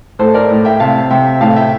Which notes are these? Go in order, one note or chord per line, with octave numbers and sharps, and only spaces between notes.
A2 A4 C5
A#4 D5
A2
E5 G5
C3 F5 A5
C3 E5 G5
A2 F5 A5
E5 G5